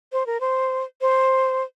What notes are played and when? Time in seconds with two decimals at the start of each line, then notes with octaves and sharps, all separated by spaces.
0.12 C5
0.26 A#4
0.40 C5
1.01 C5